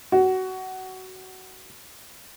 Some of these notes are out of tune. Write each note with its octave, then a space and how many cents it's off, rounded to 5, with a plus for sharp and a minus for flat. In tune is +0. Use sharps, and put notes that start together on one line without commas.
F#4 +20